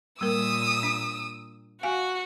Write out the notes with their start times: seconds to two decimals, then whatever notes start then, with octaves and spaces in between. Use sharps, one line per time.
0.21 A#2 G3 A#3 A#4 D#6 E6
0.83 D4
1.83 F#4 F5 G#5